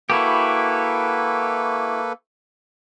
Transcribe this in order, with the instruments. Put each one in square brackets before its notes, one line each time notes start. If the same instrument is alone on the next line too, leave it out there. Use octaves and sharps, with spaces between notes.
[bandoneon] A#3 A4 B4 [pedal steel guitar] E4 F#4 G4